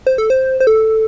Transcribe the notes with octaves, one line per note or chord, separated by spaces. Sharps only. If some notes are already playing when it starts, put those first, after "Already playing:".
C5
A4
C5
C5
A4